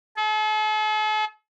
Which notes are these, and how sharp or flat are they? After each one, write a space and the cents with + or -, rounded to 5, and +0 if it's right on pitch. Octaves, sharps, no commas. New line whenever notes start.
A4 -45